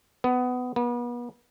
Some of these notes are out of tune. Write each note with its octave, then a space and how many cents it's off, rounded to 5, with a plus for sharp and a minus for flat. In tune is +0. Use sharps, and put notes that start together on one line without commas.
B3 +20
B3 -35